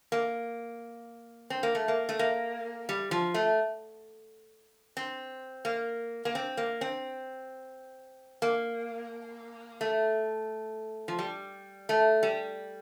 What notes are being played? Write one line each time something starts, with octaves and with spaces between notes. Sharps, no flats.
A#3
C4
A#3
A3
A#3
A3
A#3
G3
F3
A3
C4
A#3
A#3
C4
A#3
C4
A#3
A3
F3
G3
A3
G3